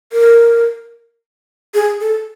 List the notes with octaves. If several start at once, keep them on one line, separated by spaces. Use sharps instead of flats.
A#4
G#4
A4